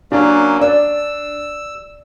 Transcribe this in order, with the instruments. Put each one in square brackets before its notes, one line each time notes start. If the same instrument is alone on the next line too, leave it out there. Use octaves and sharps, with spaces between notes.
[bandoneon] F#3 A#3 C#4 [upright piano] D4
[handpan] D5 [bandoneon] E6